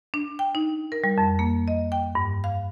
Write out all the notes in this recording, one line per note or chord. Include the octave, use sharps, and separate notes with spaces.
D4
G5
D#4
A#4
G3
F2
A#3
D#5
G5
G2
F5